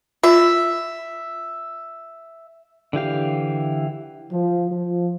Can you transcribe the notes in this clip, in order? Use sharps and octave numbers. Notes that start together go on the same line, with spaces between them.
F4 E5
D3 E3 G4 F5
F3
F3